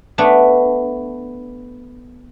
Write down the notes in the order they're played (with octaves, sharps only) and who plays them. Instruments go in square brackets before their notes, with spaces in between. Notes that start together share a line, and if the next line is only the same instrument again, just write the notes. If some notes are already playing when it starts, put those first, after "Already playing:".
[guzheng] A3 B3 D4